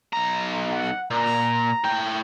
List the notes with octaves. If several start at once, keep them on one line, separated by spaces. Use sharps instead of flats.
B1 A#5
F#5
A#2 A#5
A2 G5